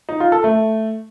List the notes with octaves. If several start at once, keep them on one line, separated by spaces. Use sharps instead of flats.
D#4
F4
A4
A3